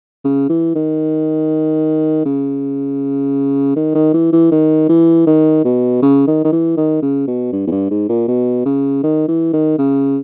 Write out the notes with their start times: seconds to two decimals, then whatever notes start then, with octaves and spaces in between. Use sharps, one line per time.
0.25 C#3
0.49 E3
0.75 D#3
2.26 C#3
3.76 D#3
3.95 D#3
4.14 E3
4.33 E3
4.52 D#3
4.89 E3
5.27 D#3
5.64 B2
6.02 C#3
6.27 D#3
6.45 D#3
6.52 E3
6.77 D#3
7.02 C#3
7.28 B2
7.53 G2
7.67 E2
7.72 G2
7.91 G#2
8.09 A#2
8.28 B2
8.66 C#3
9.04 D#3
9.28 E3
9.54 D#3
9.79 C#3